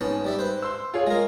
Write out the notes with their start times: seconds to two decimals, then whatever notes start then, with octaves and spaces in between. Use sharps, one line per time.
0.01 G#2 B3 C#4 A5
0.25 G3 D5 E5
0.39 B4 C5
0.62 C6 E6
0.94 F4 G#4 C#5
1.07 G#3 A#4